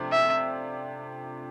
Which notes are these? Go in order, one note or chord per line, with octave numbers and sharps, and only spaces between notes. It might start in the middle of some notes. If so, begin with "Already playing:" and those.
Already playing: C3 F3 A3 D4
E5